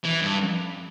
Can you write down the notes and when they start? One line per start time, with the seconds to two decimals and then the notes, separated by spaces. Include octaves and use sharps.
0.04 E3
0.21 G2